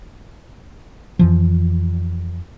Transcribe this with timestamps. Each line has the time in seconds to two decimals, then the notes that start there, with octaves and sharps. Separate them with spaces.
1.19 F2 E3 F3